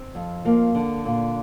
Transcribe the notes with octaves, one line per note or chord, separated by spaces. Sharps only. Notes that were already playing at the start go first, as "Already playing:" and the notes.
Already playing: C4
F2
F3 A#3
D3
A#2